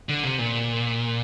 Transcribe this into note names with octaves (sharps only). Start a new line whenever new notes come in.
D3
C3
A#2